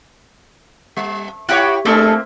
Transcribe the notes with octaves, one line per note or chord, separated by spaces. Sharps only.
G3
E4 F#4 G4 C#5 G5 B5
A3 A#3 C4 D4 E4 G#4 A4